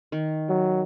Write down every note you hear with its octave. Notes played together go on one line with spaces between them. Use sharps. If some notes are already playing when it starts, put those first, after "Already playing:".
D#3
F#3